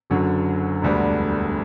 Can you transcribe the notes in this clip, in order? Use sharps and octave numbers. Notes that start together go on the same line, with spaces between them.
F#1 F#2 D3 F#3
E1 D2 D3 G3 B3